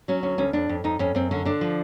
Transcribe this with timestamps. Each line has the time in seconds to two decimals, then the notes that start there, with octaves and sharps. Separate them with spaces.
0.08 F#3 C#4
0.23 D2 C#4
0.38 D2 C#4
0.53 F2 D4
0.69 F2
0.84 F2 D#4
0.99 F2 C#4
1.15 F#2 C4
1.31 D3 C#4
1.45 D3 D4
1.61 F3